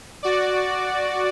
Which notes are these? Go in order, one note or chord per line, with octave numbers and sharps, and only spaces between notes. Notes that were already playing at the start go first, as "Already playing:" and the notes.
F#4 D5